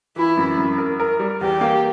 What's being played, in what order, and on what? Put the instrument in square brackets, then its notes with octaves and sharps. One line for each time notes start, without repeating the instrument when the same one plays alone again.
[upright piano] E3 [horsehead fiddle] E4
[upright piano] F#2
F#2
A#4
A#4
G3
[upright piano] E2 [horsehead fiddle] G4
[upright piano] A#3